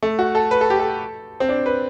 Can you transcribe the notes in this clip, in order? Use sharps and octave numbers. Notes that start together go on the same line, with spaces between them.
A3
F#4
A4
B4
A4
G4
A4
C4
D4
B4